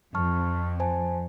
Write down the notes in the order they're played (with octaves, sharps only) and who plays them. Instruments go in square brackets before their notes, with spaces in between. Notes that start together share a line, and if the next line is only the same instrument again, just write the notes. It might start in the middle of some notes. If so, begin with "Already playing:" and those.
[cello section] F2 [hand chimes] A5 C#6 F6
[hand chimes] C5 G#5 A5